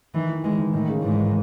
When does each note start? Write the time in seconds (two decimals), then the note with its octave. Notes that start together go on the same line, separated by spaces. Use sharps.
0.14 D#3 E3
0.29 E3
0.44 E3 G#3
0.58 D#3
0.73 A2 D#3
0.88 C#3
1.02 G#2 E3